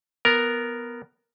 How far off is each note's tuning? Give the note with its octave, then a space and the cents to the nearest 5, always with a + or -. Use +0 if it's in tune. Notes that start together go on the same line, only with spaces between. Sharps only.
B3 +0 A#4 +0